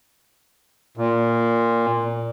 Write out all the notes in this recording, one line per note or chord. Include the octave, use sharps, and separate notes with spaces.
A#2